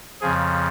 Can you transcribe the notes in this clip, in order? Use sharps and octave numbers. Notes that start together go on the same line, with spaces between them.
F2 C#3 F3 G#4